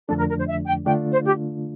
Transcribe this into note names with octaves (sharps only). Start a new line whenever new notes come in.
F2 D3 F3 A3 D4 A4
A#4
A#4
C5
E5
G5
D3 A3 D4 F4 G5
C5
G4